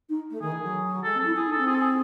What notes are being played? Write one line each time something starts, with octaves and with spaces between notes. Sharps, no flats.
D#4
A3
D#3 G#4
E3
F#3
G#3 A4
C4
A4
E4
E4 G#4
D#4
A4
C4
G#4
A4
G#4